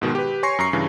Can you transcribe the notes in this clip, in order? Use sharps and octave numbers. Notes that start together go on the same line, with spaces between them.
G#2 B2 D#3 G#3
G4 B4
C#5 G#5 C6 C#6 A#6 C7
F#2 A#5 C#6 C7
G2 C#3 E3